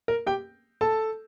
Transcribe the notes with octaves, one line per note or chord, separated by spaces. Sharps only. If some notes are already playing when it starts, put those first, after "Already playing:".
A#4
G4 G5
A4 A5